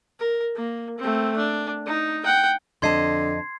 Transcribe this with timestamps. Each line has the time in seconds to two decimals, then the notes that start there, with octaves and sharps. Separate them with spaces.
0.20 A#4
0.56 A#3
0.98 A3 C4
1.37 D4
1.86 D#4
2.25 F#5 G5
2.82 F2 D3 D#5 A5 C6 G#6 C7